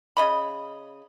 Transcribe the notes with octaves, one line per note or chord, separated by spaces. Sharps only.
C#3 D#5 B5